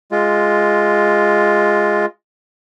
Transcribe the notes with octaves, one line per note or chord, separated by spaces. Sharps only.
G#3 F4